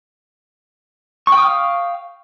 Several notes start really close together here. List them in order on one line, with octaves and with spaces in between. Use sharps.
C#6 G5 D#6 F6 F5